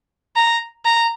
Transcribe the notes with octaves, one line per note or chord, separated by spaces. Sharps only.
A#5
A#5